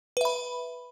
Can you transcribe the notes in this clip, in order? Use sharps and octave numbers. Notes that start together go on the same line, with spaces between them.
B4 E5 B5